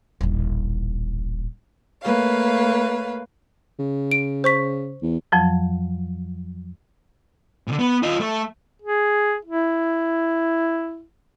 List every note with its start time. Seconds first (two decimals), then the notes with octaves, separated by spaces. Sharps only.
0.21 D#1 A1
2.02 A3 A#3 B4 C#5 F5
3.79 C#3
4.11 D7
4.44 C5 C#6 B6
5.02 E2
5.32 F2 F3 F#3
7.68 A#2 D3
7.79 B3
8.03 F4 D#5
8.20 A3
8.82 G#4
9.45 E4